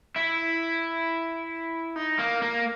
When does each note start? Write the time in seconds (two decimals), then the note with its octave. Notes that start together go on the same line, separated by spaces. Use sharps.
0.16 E4
1.96 D#4
2.19 A#3
2.42 A#3